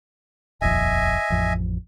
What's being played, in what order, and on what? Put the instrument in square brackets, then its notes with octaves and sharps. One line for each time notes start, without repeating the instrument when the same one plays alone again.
[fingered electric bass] D#1 A#1 F2 [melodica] D#5 E5 G#5
[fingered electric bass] A1 F2